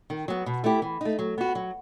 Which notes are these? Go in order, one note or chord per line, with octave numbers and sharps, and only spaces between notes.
D#3
F#3 B3
B2
A3 E4 G4
E3
A3 D#4
F#3
B3 F#4
F#3